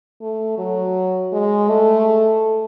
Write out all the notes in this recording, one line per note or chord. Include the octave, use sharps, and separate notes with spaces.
A3
F#3
G#3
A3